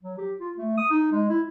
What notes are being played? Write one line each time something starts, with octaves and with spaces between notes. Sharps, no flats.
F#3
G4
F4
A3
D#6
D#4
G#3
E4